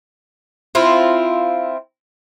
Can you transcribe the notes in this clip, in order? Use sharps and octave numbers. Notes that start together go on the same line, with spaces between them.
C4 E4 F4